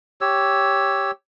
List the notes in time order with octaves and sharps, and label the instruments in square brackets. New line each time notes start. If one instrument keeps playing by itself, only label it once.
[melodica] G4 C#5 E6